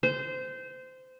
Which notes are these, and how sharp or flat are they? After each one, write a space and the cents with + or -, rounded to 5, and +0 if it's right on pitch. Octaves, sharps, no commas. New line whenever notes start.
C5 -20